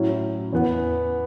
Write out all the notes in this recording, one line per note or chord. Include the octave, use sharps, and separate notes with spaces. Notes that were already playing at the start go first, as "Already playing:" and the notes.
Already playing: A2 F#3 C#4 E4
E2 E3 B3